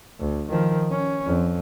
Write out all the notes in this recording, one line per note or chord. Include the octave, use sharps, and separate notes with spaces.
D2
D#3 F3
C#4
F2